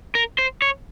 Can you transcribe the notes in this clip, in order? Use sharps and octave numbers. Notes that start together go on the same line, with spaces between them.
A#4
C5
C#5